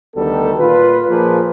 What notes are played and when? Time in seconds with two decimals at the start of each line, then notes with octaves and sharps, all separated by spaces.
0.16 D2 D#3 G3 B3 A4
0.59 A#2 F4 B4
1.09 A#2 F3 A#3 G#4 B4